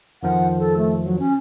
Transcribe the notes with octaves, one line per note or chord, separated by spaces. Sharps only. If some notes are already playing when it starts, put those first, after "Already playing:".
F2 D#3 F3 F#5
A4
A3
F#3
C#4